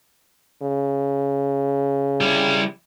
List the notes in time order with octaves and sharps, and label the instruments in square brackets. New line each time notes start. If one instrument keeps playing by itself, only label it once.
[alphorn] C#3
[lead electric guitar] G3 E4